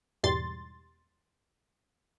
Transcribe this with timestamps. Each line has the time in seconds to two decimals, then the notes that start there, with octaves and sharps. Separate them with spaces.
0.23 E2 G#2 B2 G3 C6 A6